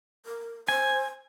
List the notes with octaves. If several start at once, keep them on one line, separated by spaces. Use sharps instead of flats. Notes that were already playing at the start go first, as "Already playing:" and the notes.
A#4
C5 G#5